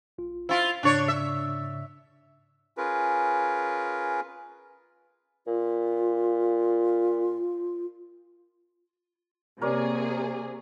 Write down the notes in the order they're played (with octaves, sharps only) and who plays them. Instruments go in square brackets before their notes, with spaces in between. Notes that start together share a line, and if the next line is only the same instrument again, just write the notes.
[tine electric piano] A#1 F4
[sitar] E4 F4 [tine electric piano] C5 F5
[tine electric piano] G#2 C#3 [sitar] D4 C#5
[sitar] E5
[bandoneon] C#4 F4 G#4 A#4 B4
[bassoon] A#2 [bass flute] F4
[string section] C3 A#3 G#4 [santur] A#4 C#5 D5